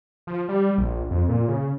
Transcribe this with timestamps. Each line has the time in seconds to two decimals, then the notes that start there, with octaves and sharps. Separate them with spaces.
0.27 F3
0.49 G3
0.78 A#1
1.11 F2
1.29 A#2
1.48 C#3